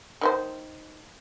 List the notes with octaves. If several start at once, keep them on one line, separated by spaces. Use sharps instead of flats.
D#3 E4 C5